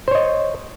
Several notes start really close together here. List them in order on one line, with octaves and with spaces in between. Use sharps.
C5 C#5 D#5